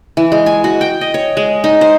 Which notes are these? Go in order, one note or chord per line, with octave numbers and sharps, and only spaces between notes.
E3
G#3
G#5
F#4
G5
D#5
C#5
G#3
D#4
C5